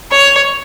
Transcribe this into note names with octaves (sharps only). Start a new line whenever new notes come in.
C#5